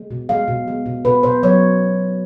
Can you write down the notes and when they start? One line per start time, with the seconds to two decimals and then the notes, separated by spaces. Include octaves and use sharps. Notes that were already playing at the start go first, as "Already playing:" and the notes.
Already playing: G#3
0.11 B2
0.29 G#3 F5
0.48 B2
0.68 G#3
0.86 B2
1.05 B2 B4
1.23 B2 C5
1.43 F#3 C#5